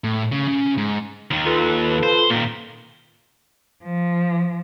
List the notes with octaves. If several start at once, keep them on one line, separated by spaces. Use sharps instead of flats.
A2
C#3
C#3
G#2
D#2 D#3
F4 A4 B4
C5
A#2 D#3 A#3 B6
F3